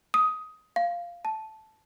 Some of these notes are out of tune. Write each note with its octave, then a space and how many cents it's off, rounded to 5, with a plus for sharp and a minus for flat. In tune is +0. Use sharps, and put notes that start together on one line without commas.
D#6 +15
F5 -10
A5 -10